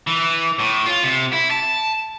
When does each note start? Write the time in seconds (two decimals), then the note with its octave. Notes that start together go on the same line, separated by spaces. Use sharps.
0.07 E3
0.59 A2
0.86 F4
1.03 C3
1.33 E4
1.51 A5